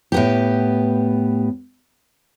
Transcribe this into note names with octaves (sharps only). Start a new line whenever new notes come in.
A2 B3 G4